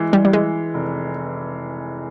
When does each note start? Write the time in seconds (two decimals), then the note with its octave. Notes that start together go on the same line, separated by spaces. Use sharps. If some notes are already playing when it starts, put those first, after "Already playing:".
Already playing: E3 G#3
0.13 G3
0.25 G3
0.33 E3 G#3
0.74 F1